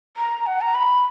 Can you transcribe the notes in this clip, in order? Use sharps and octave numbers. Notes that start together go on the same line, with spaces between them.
A#5
F#5
A#5
B5